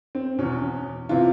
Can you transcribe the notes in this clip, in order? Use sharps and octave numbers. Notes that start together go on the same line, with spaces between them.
C4
E2 B2 C#4
C3 E3 F4